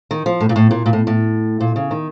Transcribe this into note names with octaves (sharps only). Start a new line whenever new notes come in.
D#3
F3
A2
A#2
A2
A#2
A#2
A2
A2
A#2
C#3
D#3